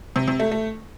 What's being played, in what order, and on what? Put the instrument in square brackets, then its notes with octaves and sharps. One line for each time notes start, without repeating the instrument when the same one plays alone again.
[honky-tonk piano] C3
C3
A3
A3